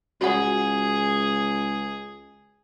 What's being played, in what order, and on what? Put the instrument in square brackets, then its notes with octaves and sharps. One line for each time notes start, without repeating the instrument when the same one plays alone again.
[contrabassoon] C#2 [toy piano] F#4 F#5 [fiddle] G#4